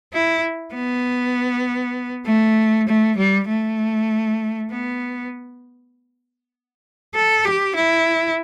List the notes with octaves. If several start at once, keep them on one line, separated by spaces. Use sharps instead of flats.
E4
B3
A3
A3
G3
A3
B3
A4
G4
E4